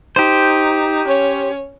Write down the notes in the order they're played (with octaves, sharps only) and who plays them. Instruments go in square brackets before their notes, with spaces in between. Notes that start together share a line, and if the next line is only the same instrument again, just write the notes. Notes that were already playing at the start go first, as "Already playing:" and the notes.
[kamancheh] D#4 [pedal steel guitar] G4 C5
[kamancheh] C#4 C#5